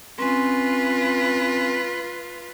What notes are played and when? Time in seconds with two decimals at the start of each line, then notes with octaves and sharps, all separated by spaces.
0.19 C4 C#4 F4 B4 G#5